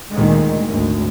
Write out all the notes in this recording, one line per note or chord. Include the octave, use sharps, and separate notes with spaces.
D2 A#2 D#3 G#3
G#1 D2